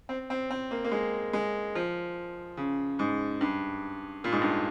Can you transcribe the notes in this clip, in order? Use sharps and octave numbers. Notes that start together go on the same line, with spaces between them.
C4
C4
C4
A#3
A#3
G#3
G#3
F3
C#3
G#2
G2
A#2
G#2
G2